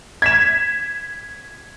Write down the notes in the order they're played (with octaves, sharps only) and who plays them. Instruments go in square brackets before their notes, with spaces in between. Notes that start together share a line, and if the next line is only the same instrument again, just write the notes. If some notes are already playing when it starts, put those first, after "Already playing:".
[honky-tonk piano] G#6 B6 E7